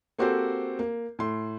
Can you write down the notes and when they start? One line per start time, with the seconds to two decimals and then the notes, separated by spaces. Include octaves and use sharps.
0.18 A#3 C4 F#4 G4 A4 C5
0.79 A#3
1.19 A2 C6